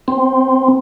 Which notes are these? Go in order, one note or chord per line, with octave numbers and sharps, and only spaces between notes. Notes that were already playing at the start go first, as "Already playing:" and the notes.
C4